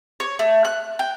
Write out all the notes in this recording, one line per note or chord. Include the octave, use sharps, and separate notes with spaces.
C#5
A3
F#6
G5